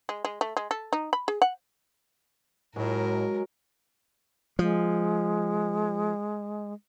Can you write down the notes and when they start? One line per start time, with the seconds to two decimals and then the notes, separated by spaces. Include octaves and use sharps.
0.09 G#3
0.25 G#3
0.41 A3
0.57 G#3
0.71 A4
0.93 D#4
1.13 B5
1.28 G#4
1.42 F#5
2.76 A2 F#3 G#3 A#4
4.59 F3 G#3